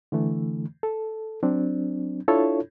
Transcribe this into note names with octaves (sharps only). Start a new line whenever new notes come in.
D3 E3 A3
A4
F#3 C4 D4
D4 E4 F4 A4 C#5